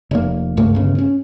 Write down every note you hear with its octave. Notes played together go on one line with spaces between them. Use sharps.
F1 A#3
C#2 G2 A3 A#3
G1 C#3
C#4